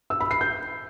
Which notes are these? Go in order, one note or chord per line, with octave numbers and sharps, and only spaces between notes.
E6
B5
C7
G6